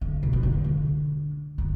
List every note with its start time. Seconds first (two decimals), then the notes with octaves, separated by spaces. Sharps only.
0.01 D3
0.23 B2
0.33 E3
0.43 D3
0.64 D3
1.58 D3